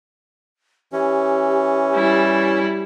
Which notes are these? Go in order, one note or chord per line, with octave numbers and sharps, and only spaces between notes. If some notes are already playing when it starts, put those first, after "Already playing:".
E3 C#4 G4
G3 E4